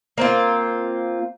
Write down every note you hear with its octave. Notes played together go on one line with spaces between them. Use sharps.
A#3 C4 F4